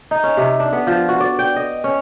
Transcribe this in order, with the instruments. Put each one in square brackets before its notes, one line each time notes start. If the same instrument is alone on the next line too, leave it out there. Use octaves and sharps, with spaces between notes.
[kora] D#4
C#4
C3
D4
B3
F3
F#4
D5
G5
D#5
C#4